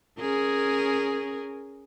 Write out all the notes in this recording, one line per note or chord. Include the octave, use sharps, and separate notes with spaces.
C#4 G#4 A#4